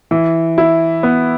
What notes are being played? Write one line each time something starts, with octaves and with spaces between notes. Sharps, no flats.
E3
E4
B3